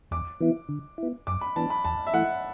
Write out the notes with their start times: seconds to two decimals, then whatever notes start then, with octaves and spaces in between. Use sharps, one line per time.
0.11 E2 D6
0.41 E3 B3 E4
0.69 D3
0.98 B3 E4
1.27 F#2 D6
1.41 B5
1.56 E3 B3 D4 A5
1.70 B5
1.84 E2 A5
2.07 E5
2.13 E3 A3 E4 F#5